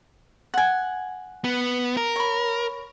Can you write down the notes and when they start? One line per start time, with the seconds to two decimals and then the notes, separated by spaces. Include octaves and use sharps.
0.54 F#5 G#5
1.44 B3
1.97 A#4
2.16 C#5 B5